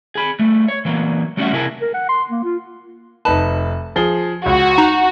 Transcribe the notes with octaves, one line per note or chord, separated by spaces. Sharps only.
G#4 B5
G3 A3
C#5
E3 F#3 A#3
F#3 G3 A3 C#4 F#4 E5
C3 E4 G#4 A#4 D#5 A5
A#4
F#5
C6
A#3
F4
F1 D#4 B4 A5
F3 G#4 G7
C#2 F#4
D#4 A#5